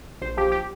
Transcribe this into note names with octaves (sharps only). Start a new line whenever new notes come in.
A#1 C5
F3 G4
G4